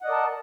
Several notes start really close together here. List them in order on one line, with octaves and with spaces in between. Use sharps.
F#5 D#5 D5 A#4 A5